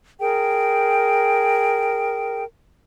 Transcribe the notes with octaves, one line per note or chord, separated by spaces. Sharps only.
G#4 A#4 G5